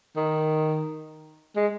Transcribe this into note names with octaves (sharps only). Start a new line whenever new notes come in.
D#3
G#3